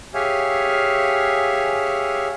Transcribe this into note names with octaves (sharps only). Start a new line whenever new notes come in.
G4 G#4 C#5 E5 F5 G#5